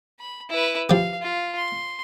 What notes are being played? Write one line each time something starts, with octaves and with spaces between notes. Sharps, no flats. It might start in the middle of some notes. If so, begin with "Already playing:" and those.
B5
E4 B4
F3 G4 F5
F4
C6